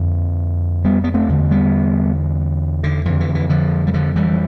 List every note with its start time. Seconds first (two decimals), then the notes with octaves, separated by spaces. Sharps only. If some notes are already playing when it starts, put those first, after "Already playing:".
Already playing: F2 D3
0.85 G3 B3
1.04 B3
1.14 A3 C4
1.28 E2 D3
1.51 G3 B3
2.83 D3
3.05 F2 D3 E3
3.20 E3
3.35 E3
3.49 D3 F3
3.87 G3
3.94 D3 F3
4.16 E3 G3